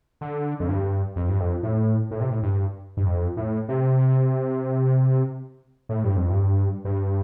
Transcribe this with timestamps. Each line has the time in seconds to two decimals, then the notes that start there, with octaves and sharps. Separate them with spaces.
0.21 D3
0.60 F2
0.69 G2
1.16 F2
1.28 G2
1.40 F2
1.63 A2
2.11 A2
2.20 C3
2.30 A2
2.43 G2
2.97 G2
3.06 F2
3.37 A2
3.69 C3
5.89 A2
6.04 G2
6.17 F2
6.30 G2
6.85 G2